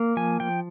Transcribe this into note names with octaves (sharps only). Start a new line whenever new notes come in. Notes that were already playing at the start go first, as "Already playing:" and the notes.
Already playing: A#3
F3 G#5
F3 G5